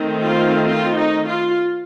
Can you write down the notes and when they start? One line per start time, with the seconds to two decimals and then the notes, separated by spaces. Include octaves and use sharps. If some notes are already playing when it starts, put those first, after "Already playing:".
Already playing: D#3 A3 C4
0.22 F4
0.68 F4
0.97 D#4
1.27 F4